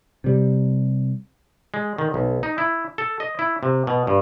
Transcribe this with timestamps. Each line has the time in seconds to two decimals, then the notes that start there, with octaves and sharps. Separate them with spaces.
0.24 C3 G3
1.74 G#3
1.98 D#3
2.14 B1
2.43 D#4
2.58 E4
2.98 A4
3.20 D#5
3.39 E4
3.63 C3
3.87 B2
4.07 G2